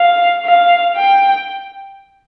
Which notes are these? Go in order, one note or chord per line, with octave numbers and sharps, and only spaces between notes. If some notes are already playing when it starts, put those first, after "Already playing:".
Already playing: F5
F5
G5